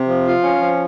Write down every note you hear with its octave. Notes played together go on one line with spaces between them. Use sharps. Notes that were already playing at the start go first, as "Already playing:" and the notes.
Already playing: C3
F3
F4
C#4
F3